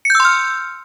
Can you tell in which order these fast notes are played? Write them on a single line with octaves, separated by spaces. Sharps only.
C#7 G6 E6 C6 F6